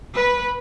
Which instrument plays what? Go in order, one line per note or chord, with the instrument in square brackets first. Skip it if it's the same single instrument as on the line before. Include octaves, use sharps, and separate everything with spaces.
[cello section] B4